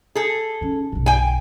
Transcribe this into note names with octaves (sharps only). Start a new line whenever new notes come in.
G#4 A4
C#4 D#4
B1 G2
G5 G#5